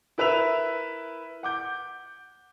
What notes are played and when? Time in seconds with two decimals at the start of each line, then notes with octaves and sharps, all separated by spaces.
0.18 E4 A#4 B4 E5 E6 F7
1.43 F#5 D6 G6